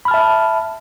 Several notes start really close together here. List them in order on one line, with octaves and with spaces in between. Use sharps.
B5 F6 A5 E5